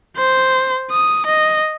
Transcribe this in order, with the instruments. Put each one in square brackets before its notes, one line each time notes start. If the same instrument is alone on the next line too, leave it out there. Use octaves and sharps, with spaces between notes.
[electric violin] C5
D#6
D#5